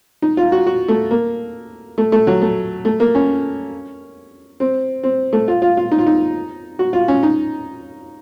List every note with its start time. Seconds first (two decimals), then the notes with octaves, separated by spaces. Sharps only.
0.22 D#4
0.37 F4
0.52 F#4
0.67 F#4
0.88 A3
1.11 A#3
1.98 A3
2.12 A3
2.27 F#3
2.41 A3
2.85 A3
3.00 A#3
3.15 C#4
4.60 C4
5.03 C4
5.33 A3
5.48 F4
5.62 F4
5.77 F4
5.92 D#4
5.99 F4
6.07 D#4
6.79 F#4
6.93 F4
7.08 C#4
7.23 D#4